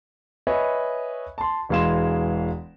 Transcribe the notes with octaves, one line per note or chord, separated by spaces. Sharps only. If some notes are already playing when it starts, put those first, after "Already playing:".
B4 C#5 D#5 E5 G#5
A5 C6
E1 E3 G#3 F5 C6 E7